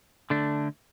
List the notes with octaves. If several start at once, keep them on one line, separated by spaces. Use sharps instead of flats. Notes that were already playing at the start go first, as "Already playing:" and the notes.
D3 A3 D4